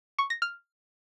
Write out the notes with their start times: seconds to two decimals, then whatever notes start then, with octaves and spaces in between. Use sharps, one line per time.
0.19 C#6
0.30 A#6
0.42 F6